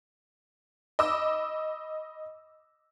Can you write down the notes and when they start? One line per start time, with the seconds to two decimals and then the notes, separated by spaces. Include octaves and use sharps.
0.99 D#5 B5 D6 E6